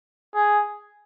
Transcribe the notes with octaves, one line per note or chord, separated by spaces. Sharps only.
G#4